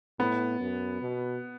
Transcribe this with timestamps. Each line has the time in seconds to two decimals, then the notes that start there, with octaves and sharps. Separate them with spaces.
0.19 A2 B3
0.60 F#2
1.02 B2